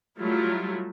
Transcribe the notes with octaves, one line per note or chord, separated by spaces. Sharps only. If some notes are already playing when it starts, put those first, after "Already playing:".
F#3 G3 A3 E4 F4